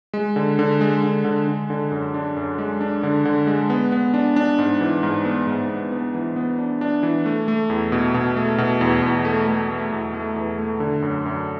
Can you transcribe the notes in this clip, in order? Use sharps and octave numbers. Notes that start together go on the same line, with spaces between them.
G#3
D3
D3
G#3
D3
D3
D3
D3
F#2
D4
F#2
G#3
D4
D3
D3
G#3
B3
B3
D4
D4
G#2
E3
G#2
B3
G#2
B3
B3
E3
B3
D4
D4
E3
A3
A3
E2
B2
B2
A3
B2
E2
E2
A3
A3
A3
E2
A3
E2
A3
D3
F#2
F#2